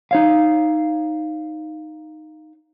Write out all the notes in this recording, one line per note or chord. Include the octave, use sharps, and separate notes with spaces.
D#4 C#5 F5